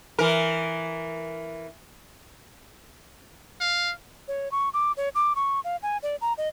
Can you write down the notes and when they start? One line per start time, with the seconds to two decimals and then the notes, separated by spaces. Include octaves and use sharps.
0.19 E3 A#4
3.60 F5
4.28 C#5
4.52 C#6
4.74 D6
4.97 C#5
5.15 D6
5.36 C#6
5.64 F5
5.83 G#5
6.03 D5
6.21 A#5
6.38 D#5